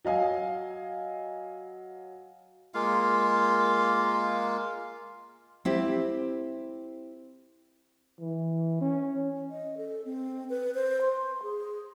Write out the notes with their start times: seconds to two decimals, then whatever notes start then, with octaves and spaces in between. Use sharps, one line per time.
0.05 F#3 D#5 F5 G#5
2.74 G#3 A#3 F4 F5
5.65 C4 E4 G4
8.21 E3
8.81 C#4
9.50 D#5
9.77 A4
10.05 C4
10.49 B4
10.75 C5
11.01 C6
11.43 G#4